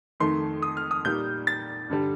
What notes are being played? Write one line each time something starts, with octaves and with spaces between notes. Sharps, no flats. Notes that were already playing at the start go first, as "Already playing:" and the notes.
F2 D#3 A3 D#4 C6
D#6
F6
D#6
A#2 G3 A#3 D#4 G6
A6
G2 D3 G3